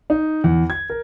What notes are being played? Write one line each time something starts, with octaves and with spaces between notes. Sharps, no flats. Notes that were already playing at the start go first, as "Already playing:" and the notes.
D#4
E2
G#6
A#4